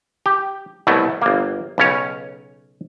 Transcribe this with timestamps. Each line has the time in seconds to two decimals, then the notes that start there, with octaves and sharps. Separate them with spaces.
0.26 G4
0.87 C2 B2 F#3 A3
1.22 G1 A#3
1.78 B1 C#3 C#4 C#5